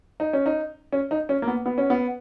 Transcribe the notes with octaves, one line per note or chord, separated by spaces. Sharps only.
D#4
C#4
D#4
C#4
D#4
C#4
A#3
B3
B3
C#4
B3